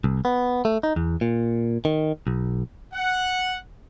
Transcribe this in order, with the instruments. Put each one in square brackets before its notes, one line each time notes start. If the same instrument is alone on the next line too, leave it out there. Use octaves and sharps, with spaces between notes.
[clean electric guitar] C2
B3
A3
D#4
E2
A#2
D#3
B1
[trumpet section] F#5